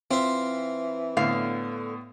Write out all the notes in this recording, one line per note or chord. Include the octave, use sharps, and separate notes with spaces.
E3 C4 F4 E5
A2 D3 B3 F5